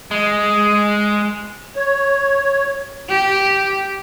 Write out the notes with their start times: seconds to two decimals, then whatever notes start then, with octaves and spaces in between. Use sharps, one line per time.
0.11 G#3
1.76 C#5
3.09 G4